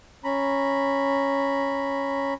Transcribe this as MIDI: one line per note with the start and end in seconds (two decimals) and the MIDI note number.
0.24 2.34 61
0.24 2.34 82
0.24 2.34 83